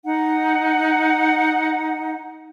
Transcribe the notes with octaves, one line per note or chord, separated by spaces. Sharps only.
D#4 F#5